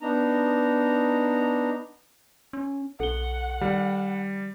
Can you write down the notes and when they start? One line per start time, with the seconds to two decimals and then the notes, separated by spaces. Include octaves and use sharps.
0.01 B3 D4 D#4 A#5
2.53 C#4
3.00 B1 A4 F#5 G7
3.61 D#3 G3